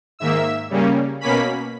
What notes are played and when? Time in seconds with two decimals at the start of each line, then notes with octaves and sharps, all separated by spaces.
0.19 G#2 D#3 A#3 E5 E6
0.70 C#3 G3 A#3 C#4
1.21 B2 A#3 C#4 B5 B6